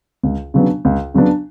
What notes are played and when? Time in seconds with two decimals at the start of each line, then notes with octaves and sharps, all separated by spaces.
0.23 C#2
0.54 C#3 F#3 B3 D4
0.85 C#2
1.14 C#3 F#3 B3 D4